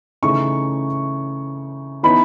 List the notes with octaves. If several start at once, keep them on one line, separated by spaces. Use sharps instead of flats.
C#3 E3 A3 D#4 C#6
E3 B3 D#4 B5